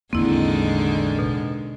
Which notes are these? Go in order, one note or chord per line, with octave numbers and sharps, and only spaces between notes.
A1 E2 D3 D#3 G#3 A#3 C4 E4
B2